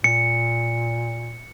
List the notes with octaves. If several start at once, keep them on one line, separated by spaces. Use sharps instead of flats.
A#2 C#7